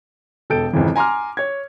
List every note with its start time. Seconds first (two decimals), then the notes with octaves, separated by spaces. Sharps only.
0.50 E1 A4 G5 G6 D7
0.73 G#1 F2 C#3 E3
0.96 G#5 A#5 C6 D6 F6
1.37 C#5 G#6